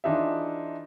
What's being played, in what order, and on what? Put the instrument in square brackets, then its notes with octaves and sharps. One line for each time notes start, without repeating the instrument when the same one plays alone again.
[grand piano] E3 D4 D#4 F4 G#4 E5